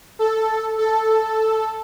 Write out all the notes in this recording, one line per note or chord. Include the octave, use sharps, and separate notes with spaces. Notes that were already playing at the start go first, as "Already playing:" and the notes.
A4
A4